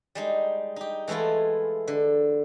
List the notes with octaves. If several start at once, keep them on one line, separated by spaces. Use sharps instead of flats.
G3 G#3 D#4
D#4 G4
E3 G#3 A3 E4 F4
D3